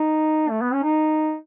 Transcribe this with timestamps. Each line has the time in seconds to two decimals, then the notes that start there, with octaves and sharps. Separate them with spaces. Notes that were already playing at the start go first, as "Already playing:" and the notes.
Already playing: D#4
0.50 A3
0.61 B3
0.73 C#4
0.83 D#4